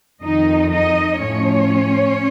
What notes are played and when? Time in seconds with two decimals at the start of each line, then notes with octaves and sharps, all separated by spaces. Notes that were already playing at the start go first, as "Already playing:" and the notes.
0.23 F2 D#3 D#4 D#5
0.72 D#4 D#5
1.20 A2 F3 C#4 C#5